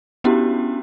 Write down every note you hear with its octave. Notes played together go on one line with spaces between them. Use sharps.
B3 C#4 D4 E4 F#4 G4